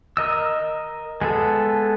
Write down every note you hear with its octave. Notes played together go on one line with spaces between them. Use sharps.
A#4 D#5 E6
G#3 B3 A4